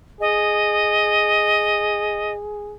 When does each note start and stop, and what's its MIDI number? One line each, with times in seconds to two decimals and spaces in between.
0.21 2.76 68
0.21 2.32 75